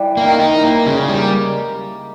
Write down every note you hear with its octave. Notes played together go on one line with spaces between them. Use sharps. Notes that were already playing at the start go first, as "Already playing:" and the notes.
Already playing: E3 G3
A#3
D#3
D#4
E3
A#3
C#3 G#3
G3
A#3